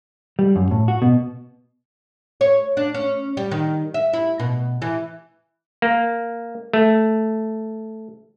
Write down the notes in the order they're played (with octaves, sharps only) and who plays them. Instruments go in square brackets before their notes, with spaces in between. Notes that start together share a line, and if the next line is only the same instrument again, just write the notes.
[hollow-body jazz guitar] G3
F#2
A2
F#4
B2
[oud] C#5
D4
C#4
G3
D#3
E5
E4
B2
E3
[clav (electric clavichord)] A#3
A3